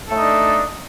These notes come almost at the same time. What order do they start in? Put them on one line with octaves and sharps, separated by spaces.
A4 A3 D#4 D4